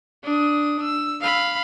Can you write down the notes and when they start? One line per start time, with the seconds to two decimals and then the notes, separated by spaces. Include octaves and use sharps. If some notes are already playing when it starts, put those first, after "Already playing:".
0.24 D4 D#6
0.83 E6
1.21 F5 B5